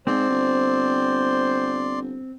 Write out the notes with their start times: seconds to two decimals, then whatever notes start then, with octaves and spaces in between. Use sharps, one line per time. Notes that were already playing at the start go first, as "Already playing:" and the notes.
0.07 G#2 C4 C5 D5 C6
0.30 G1